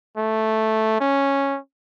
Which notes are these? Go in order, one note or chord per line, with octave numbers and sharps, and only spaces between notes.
A3
C#4